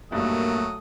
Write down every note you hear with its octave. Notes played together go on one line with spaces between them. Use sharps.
B1 G2 A#2 F#3 A3 A#3 D#6